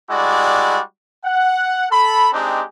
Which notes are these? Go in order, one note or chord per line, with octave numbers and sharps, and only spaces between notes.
G3 G#3 E4 F#4 D5
F#5
A4 B5
G#3 C4 D4 D#4 G4